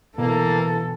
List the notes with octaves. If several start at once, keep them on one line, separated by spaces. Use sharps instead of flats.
B2 E3 A#3 A4